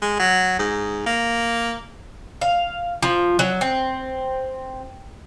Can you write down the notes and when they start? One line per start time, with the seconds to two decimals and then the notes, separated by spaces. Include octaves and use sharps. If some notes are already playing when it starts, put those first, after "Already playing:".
0.02 G#3
0.19 F#3
0.59 G#2
1.06 A#3
2.41 F5
3.02 F3
3.39 F#3
3.61 C4